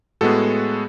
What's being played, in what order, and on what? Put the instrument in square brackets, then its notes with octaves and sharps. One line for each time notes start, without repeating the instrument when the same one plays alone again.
[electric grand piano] A2 G#3 B3 F#4 A4